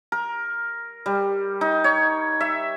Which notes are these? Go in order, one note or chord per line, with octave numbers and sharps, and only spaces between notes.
A#4
G3
D#4
C#5
E5